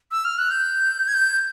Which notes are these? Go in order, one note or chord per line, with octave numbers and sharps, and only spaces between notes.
E6
F6
F#6
G6
G#6
G6